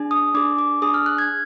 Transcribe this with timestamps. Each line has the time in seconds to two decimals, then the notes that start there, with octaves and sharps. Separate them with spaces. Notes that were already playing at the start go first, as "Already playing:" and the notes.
Already playing: D4 G#4
0.11 D#6
0.34 D4 G#4 D6
0.59 D6
0.82 D4 G#4 D#6
0.94 F6
1.06 F#6
1.18 G#6